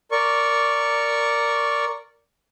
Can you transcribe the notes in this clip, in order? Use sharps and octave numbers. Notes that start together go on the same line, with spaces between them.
A#4 D5 C#6